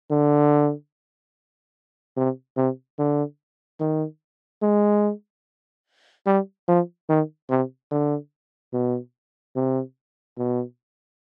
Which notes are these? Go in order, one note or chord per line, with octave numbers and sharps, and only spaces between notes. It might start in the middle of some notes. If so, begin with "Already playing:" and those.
D3
C3
C3
D3
D#3
G#3
G3
F3
D#3
C3
D3
B2
C3
B2